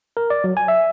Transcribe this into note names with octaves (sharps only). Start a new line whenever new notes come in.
A#4
D5
F#3
G#5
E5